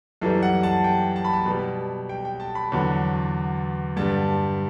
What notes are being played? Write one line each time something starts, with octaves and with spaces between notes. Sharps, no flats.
F#2 E3 G3 A4
F#5
A5
G5
A5
B5
A5
B2 G3
G5
G5
A5
B5
E2 D3 F#3
G2 D3 G3 A5